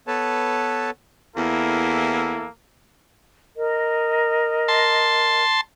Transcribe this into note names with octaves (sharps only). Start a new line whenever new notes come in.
B3 A4 B4 C#5 A5
E2 A#3 E4 A4
A#4 D#5
A5 C6